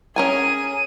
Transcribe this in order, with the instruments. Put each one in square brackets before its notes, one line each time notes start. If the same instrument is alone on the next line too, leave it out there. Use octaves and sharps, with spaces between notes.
[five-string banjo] C#4 A#4 G#5 [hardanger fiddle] G#4 [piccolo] D#7